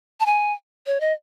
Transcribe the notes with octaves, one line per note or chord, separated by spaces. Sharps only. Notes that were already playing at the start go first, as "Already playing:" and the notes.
A5
G#5
C#5
D#5